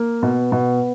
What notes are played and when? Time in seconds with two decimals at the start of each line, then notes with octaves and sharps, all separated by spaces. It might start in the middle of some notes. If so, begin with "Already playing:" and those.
Already playing: A#3
0.22 B2 B3
0.52 B2